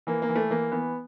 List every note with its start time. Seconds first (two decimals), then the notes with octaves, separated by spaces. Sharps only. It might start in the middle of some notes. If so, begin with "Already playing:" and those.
0.07 E3 A#3
0.22 A#3
0.29 E3
0.36 A3
0.50 E3 A#3
0.72 E3 B3